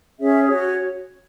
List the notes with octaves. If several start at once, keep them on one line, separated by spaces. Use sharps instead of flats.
C#4 G#4 C#5 E5
F#4 C#5